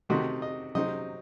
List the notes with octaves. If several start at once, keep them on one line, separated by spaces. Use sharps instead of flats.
C3 D#3 A3 C4 D#4 F#4
D#5
C3 F#3 C4 D#4 D#5